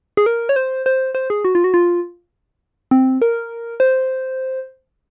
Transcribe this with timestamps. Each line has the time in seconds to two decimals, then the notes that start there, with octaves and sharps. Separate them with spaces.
0.17 G#4
0.26 A#4
0.49 C#5
0.56 C5
0.86 C5
1.15 C5
1.30 G#4
1.45 F#4
1.55 F4
1.64 F#4
1.74 F4
2.91 C4
3.22 A#4
3.80 C5